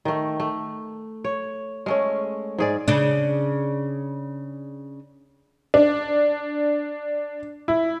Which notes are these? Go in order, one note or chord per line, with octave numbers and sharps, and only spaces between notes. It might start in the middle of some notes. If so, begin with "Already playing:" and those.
D#3 A3
A3
C#5
G#3 A3 C#4
G#2 G#4 D5
C#3 D4
D4
E4